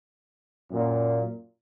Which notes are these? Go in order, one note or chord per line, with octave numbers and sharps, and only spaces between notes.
F#2 A#2